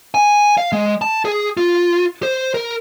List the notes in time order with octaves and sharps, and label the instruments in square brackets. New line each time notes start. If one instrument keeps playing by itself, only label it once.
[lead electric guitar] G#5
F5
G#3
A5
G#4
F4
C5
A#4